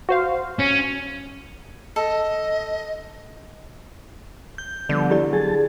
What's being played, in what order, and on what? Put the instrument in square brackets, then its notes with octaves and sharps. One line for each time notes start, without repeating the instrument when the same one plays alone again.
[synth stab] F#4 C5 F5
[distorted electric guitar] C#4
[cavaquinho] A4 [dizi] D#5
[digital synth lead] G6
[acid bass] D3 [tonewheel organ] F3 G3 B3 [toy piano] D5
[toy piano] E4 G4 D5
[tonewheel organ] F#3 A5 A6 [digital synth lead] G#4